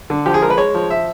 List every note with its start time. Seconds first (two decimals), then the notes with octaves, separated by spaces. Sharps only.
0.10 D3
0.26 F3 G4
0.34 G#4
0.42 G#3 A#4
0.50 B4
0.57 G#3 C#5
0.75 F3
0.90 E5